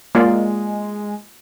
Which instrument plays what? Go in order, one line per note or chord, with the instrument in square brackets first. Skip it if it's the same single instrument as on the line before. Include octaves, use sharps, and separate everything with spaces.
[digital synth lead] G#3 [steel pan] A#3 F4 D5